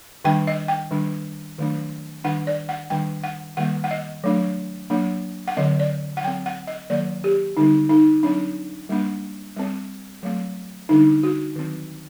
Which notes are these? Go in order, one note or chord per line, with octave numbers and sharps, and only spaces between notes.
D#3 G3 D4 G5
D#5
G5
D#3 G3 D4
D#3 F#3 A3 D4
D#3 G3 D4 F#5
D5
F#5
D#3 G3 D4 G5
F#5
D#3 G3 A#3 F#5
F#5
D#5
F#3 A3 D4
F#3 A#3 D4
F#5
D3 F#3 C4 D#5
D5
F#5
F#3 C4 G5
F#5
D#5
D#3 F#3 A#3 D5
G4
D3 G3 C4 D#4
D#4
F#3 C4 D4
G3 A#3 D4
G3 C4
F#3 A3 C4
D3 G3 D4 D#4
F#4
D#3 F#3 C4